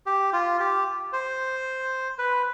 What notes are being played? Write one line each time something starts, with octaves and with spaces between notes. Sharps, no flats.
G4
F4
G4
C5
B4